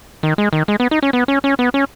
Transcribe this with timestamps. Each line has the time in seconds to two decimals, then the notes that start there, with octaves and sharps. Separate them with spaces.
0.23 D#3
0.38 G#3
0.53 D#3
0.68 G#3
0.80 B3
0.91 D#4
1.03 C#4
1.13 B3
1.28 C#4
1.44 C#4
1.59 B3
1.74 C#4